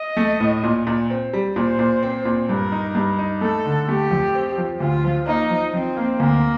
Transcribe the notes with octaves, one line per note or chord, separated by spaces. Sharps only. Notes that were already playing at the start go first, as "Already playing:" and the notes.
Already playing: D#5
A3
A2
A#2
A#2
C4
G3
A#2 C5
A#2
C4
A#2
G2 A#4
D#4
G2
D#4
A3 A4
D3
A3 G4
F2
C4
F3
D2 F4
F3
A#3 D#4
F3
F3 C4
A#3
D2 A#3